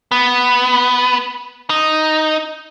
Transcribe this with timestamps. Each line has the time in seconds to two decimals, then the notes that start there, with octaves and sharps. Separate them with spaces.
0.11 B3
1.70 D#4